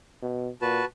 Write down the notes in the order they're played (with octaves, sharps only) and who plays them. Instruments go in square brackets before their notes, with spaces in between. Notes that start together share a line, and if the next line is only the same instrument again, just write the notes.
[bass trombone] B2
[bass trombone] A#2 [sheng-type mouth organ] F#4 B4 A5